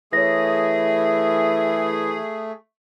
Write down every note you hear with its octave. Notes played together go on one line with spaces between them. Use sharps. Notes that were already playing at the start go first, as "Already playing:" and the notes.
E3 A3 G#4 C#5 A#6